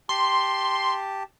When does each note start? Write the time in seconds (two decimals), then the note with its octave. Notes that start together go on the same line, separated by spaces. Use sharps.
0.09 G4 A5 C6